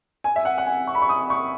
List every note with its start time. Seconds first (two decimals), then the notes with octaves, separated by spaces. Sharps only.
0.24 G#5
0.36 E5
0.45 F#5
0.58 F#5
0.66 G#5
0.87 C#6
0.95 B5
1.02 C#6
1.09 D#6
1.30 C#6